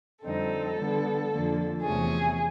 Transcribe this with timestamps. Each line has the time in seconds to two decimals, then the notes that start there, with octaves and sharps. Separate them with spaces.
0.24 F2 D3 G3 C4 D#4 A4
0.77 D3 G3 B3
1.30 F2 D3 F3 A#3
1.83 E2 C3 F3 A3 C#4 G#4